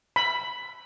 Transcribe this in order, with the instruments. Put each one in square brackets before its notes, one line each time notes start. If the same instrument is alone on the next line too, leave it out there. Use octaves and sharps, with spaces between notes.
[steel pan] B5